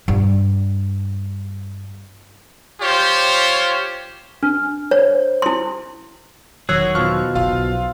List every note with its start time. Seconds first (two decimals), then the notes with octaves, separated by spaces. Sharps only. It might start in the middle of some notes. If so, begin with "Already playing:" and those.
0.08 G2 G3
2.81 F4 G4 C5 C#5
4.43 D4 F6
4.91 C5 C#5
5.42 E4 C6
6.69 E1 D#3 F#3 F#4 G#4 C#5 E6 F#6
6.95 B2 F3 C#6 F6
7.35 F#1 B1 F4 F5
7.52 B1